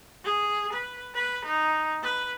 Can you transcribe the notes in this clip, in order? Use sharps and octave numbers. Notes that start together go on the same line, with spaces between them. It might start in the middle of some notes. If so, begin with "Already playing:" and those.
G#4
B4
B4
D#4
B4